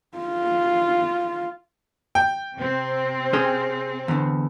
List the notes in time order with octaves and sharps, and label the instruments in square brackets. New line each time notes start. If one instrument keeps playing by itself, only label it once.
[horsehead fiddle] F4
[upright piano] G5
[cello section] C3 C4
[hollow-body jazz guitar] C#4 G#4 C5
E2 D3